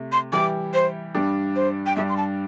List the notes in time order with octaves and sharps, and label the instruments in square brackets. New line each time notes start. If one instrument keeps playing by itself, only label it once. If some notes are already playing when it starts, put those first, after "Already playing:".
Already playing: [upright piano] C3 A3
[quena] C6
[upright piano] E3 G3 E4 G4 [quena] D6
[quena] C5
[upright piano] G2 G3 D4
[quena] C5
G5
[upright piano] G2 G3 D4 [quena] E5
[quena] C6
A5